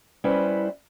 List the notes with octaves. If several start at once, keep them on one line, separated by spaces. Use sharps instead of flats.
G3 C#4 E4 B4 C5